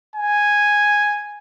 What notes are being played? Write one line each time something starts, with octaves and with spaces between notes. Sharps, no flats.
G#5